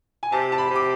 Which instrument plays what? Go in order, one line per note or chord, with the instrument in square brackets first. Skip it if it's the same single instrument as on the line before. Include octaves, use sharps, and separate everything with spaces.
[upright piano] G#5
[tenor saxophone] C3 [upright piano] A5
[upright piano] A5
B5
[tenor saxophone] C3
[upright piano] D6